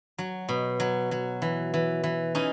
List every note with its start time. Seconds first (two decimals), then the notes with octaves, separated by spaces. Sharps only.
0.18 F#3
0.49 B2
0.80 F#3
1.11 F#3
1.42 E3
1.74 E3
2.04 E3
2.35 E3 C#4 D#4